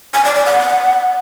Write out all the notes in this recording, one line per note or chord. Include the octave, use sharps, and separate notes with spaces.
G#5
D5
D5
F#5